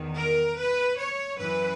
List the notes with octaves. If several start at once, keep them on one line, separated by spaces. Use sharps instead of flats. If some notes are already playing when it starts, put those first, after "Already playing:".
Already playing: E2 D#3
A#4
B4
C#5
F#2 E3 B4